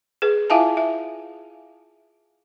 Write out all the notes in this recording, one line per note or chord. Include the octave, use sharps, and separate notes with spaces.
G#4 B4
E4 F4 E5 F5 G#5 A5
E5